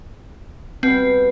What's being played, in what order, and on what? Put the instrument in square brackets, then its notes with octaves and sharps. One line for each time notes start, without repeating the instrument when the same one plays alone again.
[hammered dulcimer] B2 G3 [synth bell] C4